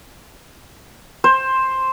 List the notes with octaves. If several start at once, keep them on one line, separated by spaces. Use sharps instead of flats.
C5